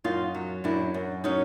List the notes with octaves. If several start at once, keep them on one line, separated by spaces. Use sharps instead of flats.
F#2 D#4 F4
F#3
F#2 D4 E4
F#2
F#3 C#4 D#4